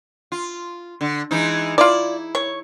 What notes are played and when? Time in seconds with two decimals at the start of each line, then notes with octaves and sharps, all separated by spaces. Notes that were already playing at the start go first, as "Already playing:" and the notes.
0.32 F4
1.01 D3
1.31 E3 G#3 D#4
1.78 E4 F4 D5
2.35 C#5